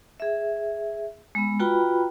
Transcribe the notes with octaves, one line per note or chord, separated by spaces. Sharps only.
G#4 E5
G#3 B3
F4 F#4 B4 G5 A#5 B5